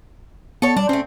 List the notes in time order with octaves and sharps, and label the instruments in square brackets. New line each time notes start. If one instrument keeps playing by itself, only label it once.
[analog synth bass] B3 [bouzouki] A4 C#5
[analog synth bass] G3 [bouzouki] D4
[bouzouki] A3 C4 [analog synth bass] C#4